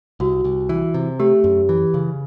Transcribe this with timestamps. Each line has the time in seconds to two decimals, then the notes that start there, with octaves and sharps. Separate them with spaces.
0.20 C2 F#4
0.44 C2
0.69 E3
0.94 C3
1.20 A3 G4
1.44 F#2
1.69 E3
1.94 C#3